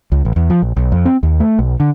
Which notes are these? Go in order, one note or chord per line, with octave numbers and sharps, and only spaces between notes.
C#2
A1
E2
F3
A#1
B1
F2
C4
D#2
A3
B1
D3